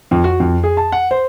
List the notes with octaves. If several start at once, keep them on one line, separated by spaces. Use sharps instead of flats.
F2
F#4
F2
G#4
A5
F#5
C5